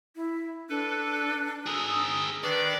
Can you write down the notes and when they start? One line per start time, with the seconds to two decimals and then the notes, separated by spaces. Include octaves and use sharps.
0.16 E4
0.69 D4 A4 B4
1.66 G#4 A#4 D#6 E6
2.44 D#3 D4 B4 D5